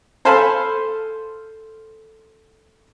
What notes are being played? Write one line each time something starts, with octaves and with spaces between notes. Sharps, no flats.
A4 C5 F5 G#5 A5 B5